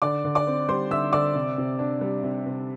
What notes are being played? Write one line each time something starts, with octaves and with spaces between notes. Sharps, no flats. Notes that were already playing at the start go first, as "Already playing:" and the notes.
D3 D5 D6
D3
D5 D6
C4
G3 C5 C6
D3 E5 E6
D3 D5 D6
C3
C3
D4
G3
C3
C3